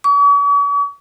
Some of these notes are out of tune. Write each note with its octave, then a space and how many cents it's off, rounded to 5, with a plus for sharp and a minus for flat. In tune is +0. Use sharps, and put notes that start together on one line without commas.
C#6 +45